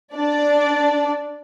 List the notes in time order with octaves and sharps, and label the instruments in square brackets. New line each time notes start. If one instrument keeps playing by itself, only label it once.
[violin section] D4 D5